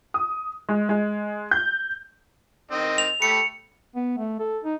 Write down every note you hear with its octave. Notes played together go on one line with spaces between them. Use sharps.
D#6
G#3
G#3
G6
D#3 C4 D#5
F7
A3 G4 B5 C#7
B3
A3
A4
D#4